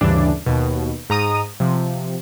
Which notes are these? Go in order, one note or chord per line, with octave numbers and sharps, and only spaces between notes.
D2 G2 C#3 E3 D4
D#2 B2
G#2 A#5 D#6
C3 F3